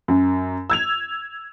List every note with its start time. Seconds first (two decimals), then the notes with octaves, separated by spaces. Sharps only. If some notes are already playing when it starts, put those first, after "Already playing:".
0.08 F#2
0.70 E6 G#6 F7